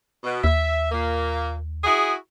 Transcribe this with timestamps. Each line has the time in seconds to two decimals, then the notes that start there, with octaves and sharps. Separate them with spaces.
0.24 B2
0.44 D#2 E5
0.92 A#2 A#3
1.84 E4 F#4 G#4